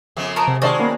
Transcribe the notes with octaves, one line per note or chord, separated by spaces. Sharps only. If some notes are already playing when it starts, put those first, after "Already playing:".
F2 C#3 B3
A#4 A5 A#5 C#6 D#6 D7
C3
D#3 G#3 F#4 G#4 C5 D5 A5 F6
A#3 B3 C#4